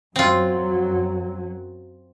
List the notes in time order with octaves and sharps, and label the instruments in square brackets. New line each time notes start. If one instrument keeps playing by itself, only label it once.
[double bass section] F#2 F#3 [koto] C4 F4